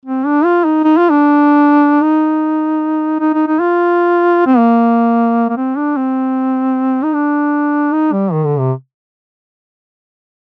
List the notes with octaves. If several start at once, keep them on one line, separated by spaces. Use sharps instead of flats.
C4
D4
F4
D#4
D#4
F4
D4
D#4
D#4
D#4
D#4
F4
C4
A#3
A#3
C4
D4
C4
D#4
D4
D#4
G3
D#3
D3
C3